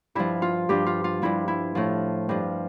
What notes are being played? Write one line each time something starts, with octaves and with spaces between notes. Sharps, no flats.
G2 F3 E4
F4
G2 F3 G4
F4
F4
G2 F3 E4
E4
A2 F3
G2 F3